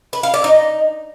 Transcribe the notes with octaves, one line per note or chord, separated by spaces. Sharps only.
B4
F5
D5
D#4